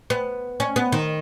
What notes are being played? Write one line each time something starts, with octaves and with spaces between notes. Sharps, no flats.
B3
C#4
B3
D#3